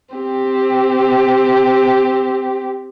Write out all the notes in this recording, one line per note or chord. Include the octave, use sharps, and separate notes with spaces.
C4 G4